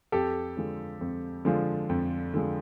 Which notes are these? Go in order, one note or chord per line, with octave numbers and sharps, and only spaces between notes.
F2 G4 A4
D3 F3 G#3
F2
D3 F3 G#3
F2
D3 F3 G#3